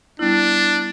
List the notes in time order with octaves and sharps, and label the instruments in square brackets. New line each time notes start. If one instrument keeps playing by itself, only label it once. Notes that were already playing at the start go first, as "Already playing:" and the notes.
[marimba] G3 B3 E4 [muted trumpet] D4